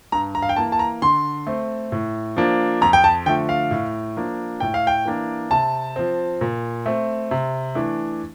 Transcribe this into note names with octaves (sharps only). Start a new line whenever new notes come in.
G2 A#5
A#5
F5
G5
E3 A#3 A5
A5
A#5
D3 C6
A3 C4
A2
F3 A#3 D4
F2 A#5
G5
A5
D3 F3 A3 G5
F5
A2
F3 A#3 D4
A2 G5
F5
G5
E3 A#3 D4
C3 A5
F3 C4
A#2
A3 C4
C3
E3 A3 D4